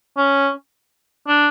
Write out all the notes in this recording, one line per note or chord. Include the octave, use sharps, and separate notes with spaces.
C#4
D4